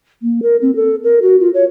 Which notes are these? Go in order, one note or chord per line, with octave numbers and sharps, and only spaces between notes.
A#3
A#4
C4
A4
A#4
F#4
F4
C#5